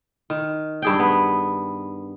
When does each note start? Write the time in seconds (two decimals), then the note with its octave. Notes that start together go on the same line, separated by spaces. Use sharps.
0.30 D#3
0.82 G2 G#4 G5
0.99 B3